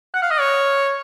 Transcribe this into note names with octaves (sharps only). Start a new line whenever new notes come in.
F#5 F#6
F5 F6
D#5 D#6
C#5 F6
C#6